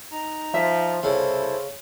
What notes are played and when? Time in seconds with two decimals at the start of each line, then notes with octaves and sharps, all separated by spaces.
0.12 D#4 A#5
0.54 F3 E5
1.03 C2 C#3 E4 A4 C5